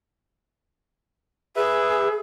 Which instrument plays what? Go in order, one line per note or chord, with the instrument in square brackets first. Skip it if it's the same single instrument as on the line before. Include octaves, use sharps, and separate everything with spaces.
[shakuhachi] G#4 [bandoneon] B4 E5